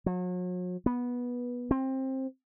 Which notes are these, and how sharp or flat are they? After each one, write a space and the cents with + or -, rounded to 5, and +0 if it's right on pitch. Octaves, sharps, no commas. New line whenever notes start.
F#3 -40
B3 -15
C4 +20